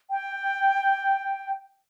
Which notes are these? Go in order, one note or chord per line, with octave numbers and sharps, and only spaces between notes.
G5